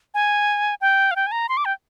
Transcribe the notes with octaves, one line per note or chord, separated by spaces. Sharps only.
G#5
G5
F5
G5
G#5
A#5
C6
D6
G5